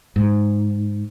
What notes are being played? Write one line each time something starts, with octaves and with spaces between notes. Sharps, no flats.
G#2